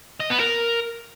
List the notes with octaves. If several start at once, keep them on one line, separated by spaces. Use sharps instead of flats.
D#5
B3
A#4